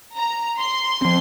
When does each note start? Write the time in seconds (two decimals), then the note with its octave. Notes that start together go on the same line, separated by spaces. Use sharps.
0.16 A#5
0.59 C6
1.02 F3 C4